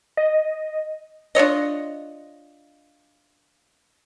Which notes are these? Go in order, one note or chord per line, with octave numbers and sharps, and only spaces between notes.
D#5
D4 F4 C#5 D#5